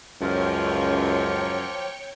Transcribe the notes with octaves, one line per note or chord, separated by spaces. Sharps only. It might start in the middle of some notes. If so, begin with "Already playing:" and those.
C#2 F#2 F3 F#3 A#3 C#5 G5 C#6